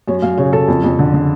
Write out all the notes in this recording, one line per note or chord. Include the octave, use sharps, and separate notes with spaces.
F#2 C#5
F#2 F5
C#3 C#5
C#3 A4
F2
F2
D3
D3